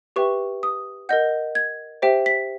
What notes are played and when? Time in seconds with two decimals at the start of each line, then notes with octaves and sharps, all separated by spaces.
0.16 G4 B4 E5 G5 C#6
0.63 D#6
1.09 A#4 D#5 F#5 G6
1.55 G#6
2.02 G4 C5 E5 G5
2.26 B6